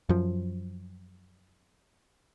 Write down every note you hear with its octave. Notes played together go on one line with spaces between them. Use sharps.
F#2 F3